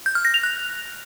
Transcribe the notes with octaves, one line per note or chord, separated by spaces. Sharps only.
G6
F6
A#6
F7
F#6